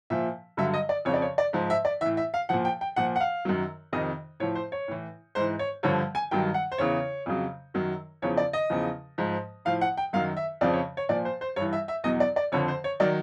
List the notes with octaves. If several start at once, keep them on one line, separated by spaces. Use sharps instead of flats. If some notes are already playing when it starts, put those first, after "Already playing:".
A#2 F3 E5
G2 D3 F#3 E5
D#5
D5
F2 C#3 F3 C#5
D5
C#5
D5
G#2 F3
E5
D5
A2 E3 E5
E5
F5
A#2 F3 F#5
G5
G5
A#2 F3 F#5
F#5
F5
F#2 D#3 F#3
F2 C3 D#3 D#5
A2 F3 C#5
C5
C#5
A2 E3
G#2 E3 C5
C#5
G2 D3 F3 C#5
G#5
G2 D#3 F#3 G5
F#5
C5
E2 C#3 E3 C#5
F2 C#3 F#3
F#2 D#3 F#3
E2 C#3 F3 C#5
D5
D#5
E2 C#3 F3
G#2 F3
A2 F3 F5
F#5
G5
F#2 D#3 F#3 F5
E5
F2 C#3 F3 D5
C#5
C#5
A#2 F3 D5
C5
C5
G2 E3 C#5
E5
E5
E2 B2 F#3 D#5
D5
D5
F2 D3 F3 C#5
C5
C#5
D#3 F#3 D5